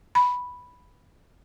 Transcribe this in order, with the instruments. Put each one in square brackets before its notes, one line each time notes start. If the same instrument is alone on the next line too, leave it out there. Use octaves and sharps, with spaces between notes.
[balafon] B5